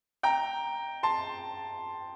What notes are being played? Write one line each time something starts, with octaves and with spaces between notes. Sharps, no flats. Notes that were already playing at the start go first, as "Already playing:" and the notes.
G5 A#5
A5 C6